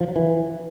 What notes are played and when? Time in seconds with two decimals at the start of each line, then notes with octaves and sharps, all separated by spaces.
0.01 F3
0.08 F#3
0.16 E3